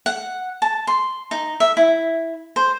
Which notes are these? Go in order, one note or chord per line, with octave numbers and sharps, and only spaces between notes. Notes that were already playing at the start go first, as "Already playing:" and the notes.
F#5
A5
C6
D#4
E5
E4
C5